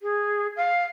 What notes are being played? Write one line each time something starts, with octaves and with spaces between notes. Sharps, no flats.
G#4
F5